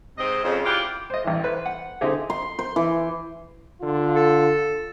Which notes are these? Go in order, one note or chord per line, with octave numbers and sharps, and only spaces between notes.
G#2 C3 C4 D#5
F2 C#3
E4 F4 G4 D5 F5 F#5
C5 D#5
A1 E3
B4 C5
F#5
D3 C4 D#4 E4 G4 G#4
C6
C5
E3
D3 F4
A4